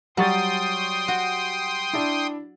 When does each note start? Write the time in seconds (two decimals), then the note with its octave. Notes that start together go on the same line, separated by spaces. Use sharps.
0.17 F#3 G3 G5 C6 C#6 D#6 A6
1.08 F#4
1.93 D4 E4